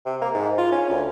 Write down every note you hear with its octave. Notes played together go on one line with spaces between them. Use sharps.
C3
A#3
G#2
F4
C#4
D2